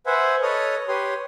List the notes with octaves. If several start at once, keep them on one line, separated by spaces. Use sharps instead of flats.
B4 C5 E5 F#5 G#5
A4 B4 C#5 D#5 D#6 F6
G4 B4 C#5 C6 D#6